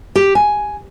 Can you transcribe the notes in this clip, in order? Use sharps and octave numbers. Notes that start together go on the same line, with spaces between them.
G4
G#5